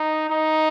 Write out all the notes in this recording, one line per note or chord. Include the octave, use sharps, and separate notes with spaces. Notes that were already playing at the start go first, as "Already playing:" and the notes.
Already playing: D#4
D#4